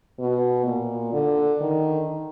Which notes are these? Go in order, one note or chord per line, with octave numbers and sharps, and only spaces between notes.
B2
A#2
D3
D#3